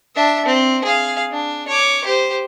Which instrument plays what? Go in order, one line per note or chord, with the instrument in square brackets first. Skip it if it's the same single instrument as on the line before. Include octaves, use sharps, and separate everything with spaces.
[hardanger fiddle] D4 E5
C4
G#4 F5
D4
C#5 D6
G4 C5